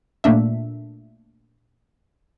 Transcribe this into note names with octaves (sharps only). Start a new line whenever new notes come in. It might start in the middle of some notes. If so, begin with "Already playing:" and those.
A#2 A3 A#3 D4 E5